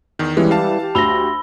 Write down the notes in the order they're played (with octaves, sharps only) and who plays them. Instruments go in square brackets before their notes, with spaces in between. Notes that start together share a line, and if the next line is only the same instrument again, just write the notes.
[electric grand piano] E2 D#3
[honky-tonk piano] E3 [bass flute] G3 [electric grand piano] G#3 C#4
[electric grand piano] F5 A5
[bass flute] G4
[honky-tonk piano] D2 A#6 [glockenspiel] B5 E6 G7